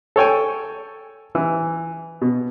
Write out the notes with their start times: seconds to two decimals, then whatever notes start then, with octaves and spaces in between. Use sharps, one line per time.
0.16 A4 C#5 G5 G#5
1.35 E3
2.22 B2